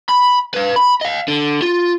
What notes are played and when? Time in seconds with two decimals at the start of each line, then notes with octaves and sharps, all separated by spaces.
0.09 B5
0.54 B4 F5
0.76 B5
1.01 D#5 F5
1.28 D3
1.62 F4